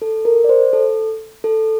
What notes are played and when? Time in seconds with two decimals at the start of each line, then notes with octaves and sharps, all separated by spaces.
0.02 A4
0.25 A#4
0.44 D5
0.49 C5
0.73 A4
1.44 A4